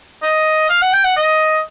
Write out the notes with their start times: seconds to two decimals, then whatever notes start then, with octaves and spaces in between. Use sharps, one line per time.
0.23 D#5
0.69 F5
0.81 F#5
0.93 G5
1.04 F#5
1.17 D#5